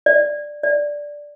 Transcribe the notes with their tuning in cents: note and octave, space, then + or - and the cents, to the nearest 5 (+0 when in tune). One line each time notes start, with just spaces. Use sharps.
D5 +5
D5 -5